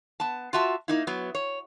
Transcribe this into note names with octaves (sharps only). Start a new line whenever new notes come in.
B3 A5
F4 F#4 E5 A5
A#3 D#4 E4
F#3 B3
C#5